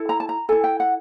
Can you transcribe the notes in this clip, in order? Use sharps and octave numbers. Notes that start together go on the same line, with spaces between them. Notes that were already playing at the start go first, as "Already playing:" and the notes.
Already playing: E4 A4
A#5
A5
A#5
E4 A4 G#5
G5
F#5